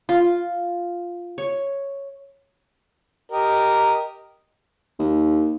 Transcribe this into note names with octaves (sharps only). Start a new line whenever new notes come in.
F4
C#5
G4 A#4 D#5
D#2